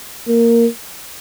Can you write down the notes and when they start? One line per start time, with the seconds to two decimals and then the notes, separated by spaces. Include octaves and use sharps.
0.28 A#3